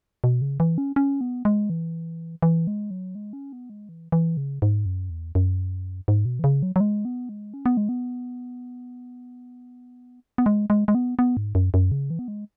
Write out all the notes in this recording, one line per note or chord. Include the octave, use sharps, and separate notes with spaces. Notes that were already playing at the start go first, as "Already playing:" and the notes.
B2
C#3
E3
C#4
C#4
B3
G#3
E3
E3
G#3
F#3
G#3
C#4
B3
G#3
E3
E3
C#3
G#2
F#2
E2
F#2
G#2
B2
E3
C#3
F#3
F#3
G#3
B3
G#3
C#4
B3
G#3
B3
B3
G#3
G#3
G#3
B3
B3
G#2
F#2
F#2
C#3
E3
B3
G#3